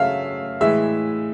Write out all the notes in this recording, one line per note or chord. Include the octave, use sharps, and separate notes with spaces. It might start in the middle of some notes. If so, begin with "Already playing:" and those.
Already playing: C#3 F#3 A3 E5 F5
A2 E3 G#3 E5